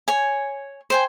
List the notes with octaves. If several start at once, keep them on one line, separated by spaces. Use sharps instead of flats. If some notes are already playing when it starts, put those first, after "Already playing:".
C#5 G#5
C5 G5 G#5